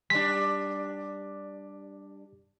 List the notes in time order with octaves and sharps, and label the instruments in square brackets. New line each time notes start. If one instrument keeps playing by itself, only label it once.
[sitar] G3 D4 [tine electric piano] B6